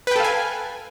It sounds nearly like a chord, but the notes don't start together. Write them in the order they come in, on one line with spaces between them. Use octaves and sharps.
B4 G5 A4 F5 G#5